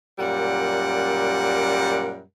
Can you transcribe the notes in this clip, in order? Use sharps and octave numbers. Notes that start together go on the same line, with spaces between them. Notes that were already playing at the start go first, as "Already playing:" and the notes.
F#2 A#2 G3 A#4 F#5